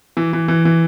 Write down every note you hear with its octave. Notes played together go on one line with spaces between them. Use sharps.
E3
E3
E3
E3